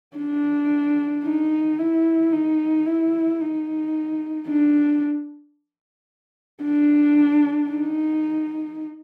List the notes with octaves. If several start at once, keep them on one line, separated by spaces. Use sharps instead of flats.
D4
D#4
E4
D#4
E4
D#4
D4
D4
D#4